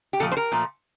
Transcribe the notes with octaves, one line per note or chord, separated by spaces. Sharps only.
G4
A#2 F3 A3 A4
C5
A#4
A#2 F3 A3